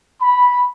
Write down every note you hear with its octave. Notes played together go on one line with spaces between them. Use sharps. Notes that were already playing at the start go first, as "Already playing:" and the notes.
B5